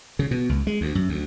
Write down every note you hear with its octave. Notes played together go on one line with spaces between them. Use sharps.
C#3
B2
C#2
G#3
D2
F#2
D2